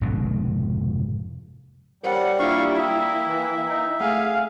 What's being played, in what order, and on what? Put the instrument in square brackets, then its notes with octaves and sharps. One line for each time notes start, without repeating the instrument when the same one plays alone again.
[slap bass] F1 G#2 B2 D3
[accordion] G3 [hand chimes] A#4 C5 C#5 [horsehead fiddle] F#5
[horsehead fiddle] A#3 E4 [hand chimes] D4 F4 E5 [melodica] F5 C#6
[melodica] E5 [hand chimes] G5 D#6
[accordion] E3
D#4
[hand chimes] A3 F#5 D#6 [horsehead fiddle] G#4 [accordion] F5